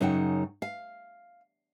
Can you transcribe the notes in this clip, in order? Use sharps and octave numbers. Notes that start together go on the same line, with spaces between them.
F#2 C#3 D#4 F#5 G5
F5